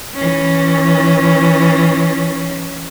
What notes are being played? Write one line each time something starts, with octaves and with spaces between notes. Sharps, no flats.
E3 C#4